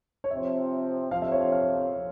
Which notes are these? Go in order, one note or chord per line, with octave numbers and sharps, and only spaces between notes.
C#5
C3 F3 C4 E5
F2 C3 F3 F5
E5
C#5
F5